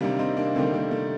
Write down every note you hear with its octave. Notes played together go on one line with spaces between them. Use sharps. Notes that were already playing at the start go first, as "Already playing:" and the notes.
C3 D#3 G3 A#3 D4
C4 D#4
A#3 D4
C3 D#3 G3 A3 C4
A#3
A3